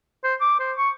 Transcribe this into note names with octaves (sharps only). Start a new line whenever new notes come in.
C5
D6
C5
C#6